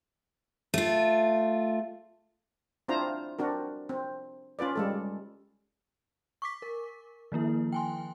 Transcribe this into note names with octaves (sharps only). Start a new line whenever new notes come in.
A3 F4
C4 D4 E4 F4 C5 A#5
C4 D4 F#4 A#4
C4
C#4 F4 B4 D5
G3 G#3 A4
C#6 D6 B6
A#4
D#3 F3 A#3 E4
G5 G#5 C6